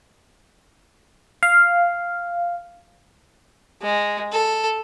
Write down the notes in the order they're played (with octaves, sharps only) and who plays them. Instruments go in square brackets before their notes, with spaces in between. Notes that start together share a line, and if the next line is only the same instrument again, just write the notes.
[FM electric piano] F5
[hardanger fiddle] G#3
A4